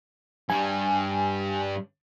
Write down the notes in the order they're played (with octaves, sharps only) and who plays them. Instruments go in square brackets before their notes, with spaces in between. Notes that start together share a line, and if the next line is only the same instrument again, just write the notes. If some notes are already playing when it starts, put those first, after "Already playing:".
[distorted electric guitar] G2 G3 [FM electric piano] G#5